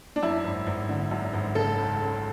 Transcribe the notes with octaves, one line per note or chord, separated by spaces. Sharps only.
D4
F#2 E4
G#1
G#1
D3
F#2
G#1
C#3 A4
C#2
C#2